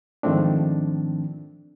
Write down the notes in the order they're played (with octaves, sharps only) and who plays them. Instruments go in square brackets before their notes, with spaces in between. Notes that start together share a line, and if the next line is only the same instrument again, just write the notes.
[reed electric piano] G#2 D#3 F3 A3 C4 D4